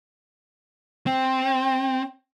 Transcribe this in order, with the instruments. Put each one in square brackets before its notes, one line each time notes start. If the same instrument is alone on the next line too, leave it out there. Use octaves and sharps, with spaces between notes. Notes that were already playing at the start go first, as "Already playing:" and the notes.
[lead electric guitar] C4 [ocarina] G5